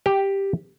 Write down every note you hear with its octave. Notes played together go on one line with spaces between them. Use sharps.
G4